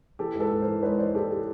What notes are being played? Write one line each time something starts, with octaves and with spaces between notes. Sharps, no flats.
E3 G4 A4
G#2
A4 B4
G#2
A#4 C5
E3
G#2 B4 C#5
E3 C5 D5
E3 G4 A4
G4